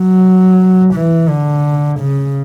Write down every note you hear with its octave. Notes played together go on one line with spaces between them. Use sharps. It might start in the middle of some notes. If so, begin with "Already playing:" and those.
Already playing: F#3
E3
D3
C#3